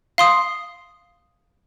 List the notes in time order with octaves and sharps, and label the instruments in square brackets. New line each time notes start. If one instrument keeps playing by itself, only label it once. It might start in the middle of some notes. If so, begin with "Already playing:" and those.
[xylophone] F5 C6 D#6